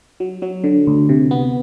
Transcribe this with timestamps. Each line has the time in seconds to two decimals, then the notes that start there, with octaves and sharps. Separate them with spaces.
0.20 F#3
0.42 F#3
0.64 D3
0.87 D2
1.09 C3
1.31 B3